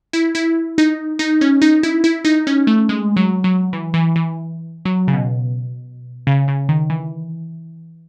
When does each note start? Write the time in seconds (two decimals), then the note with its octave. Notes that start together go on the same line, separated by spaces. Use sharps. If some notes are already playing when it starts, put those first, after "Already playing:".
0.13 E4
0.35 E4
0.78 D#4
1.19 D#4
1.41 C#4
1.62 D#4
1.83 E4
2.04 E4
2.25 D#4
2.47 C#4
2.67 A3
2.89 G#3
3.16 F#3
3.44 F#3
3.73 E3
3.94 E3
4.16 E3
4.85 F#3
5.08 C#3
5.13 B2
6.27 C#3
6.48 C#3
6.69 D#3
6.90 E3